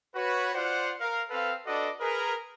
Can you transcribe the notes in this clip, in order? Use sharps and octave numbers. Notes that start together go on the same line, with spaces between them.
F#4 B4 C#5
F4 C5 D5 F#5
A#4 F5
C4 A4 B4 F5
D4 F#4 A4 B4 D5 D#5
G#4 A#4 B4